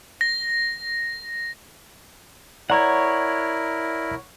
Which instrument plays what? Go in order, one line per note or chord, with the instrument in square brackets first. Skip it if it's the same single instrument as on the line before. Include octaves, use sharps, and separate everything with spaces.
[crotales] A#6
[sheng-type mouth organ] E4 A#4 [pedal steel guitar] C#5 F#5 [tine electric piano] D5 A#5